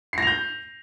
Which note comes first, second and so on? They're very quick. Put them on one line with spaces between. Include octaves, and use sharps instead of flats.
C7 A#6 F7 G6